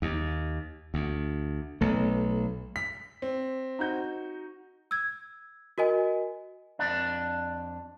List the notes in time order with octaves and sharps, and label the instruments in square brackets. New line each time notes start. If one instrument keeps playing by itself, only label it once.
[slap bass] D#2
D2
B1 A3
[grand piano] B6
C4
[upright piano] D#4 F#4 G6
[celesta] E6 G#6
F#4 A#4 D#5 G#5
[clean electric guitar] F2 D4